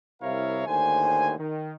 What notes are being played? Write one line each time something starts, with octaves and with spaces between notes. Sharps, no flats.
C2 C3 E4 A#4 C#5 F5
D#2 A2 D3 C5 G#5
D#3